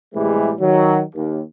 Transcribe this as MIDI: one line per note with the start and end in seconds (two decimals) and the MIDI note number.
0.13 0.52 45
0.13 0.52 48
0.13 0.52 52
0.13 0.52 55
0.13 0.52 56
0.59 1.01 51
0.59 1.01 54
1.15 1.40 39